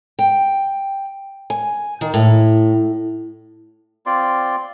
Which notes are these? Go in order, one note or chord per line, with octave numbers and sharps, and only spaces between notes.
G5
G#5
D#3
A2
C4 F4 D5 C6